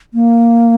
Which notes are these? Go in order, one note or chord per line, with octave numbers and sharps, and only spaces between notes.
A#3